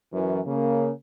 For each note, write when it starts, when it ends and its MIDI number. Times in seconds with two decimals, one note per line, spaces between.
0.13 0.41 42
0.13 0.41 52
0.47 0.91 49
0.47 0.91 58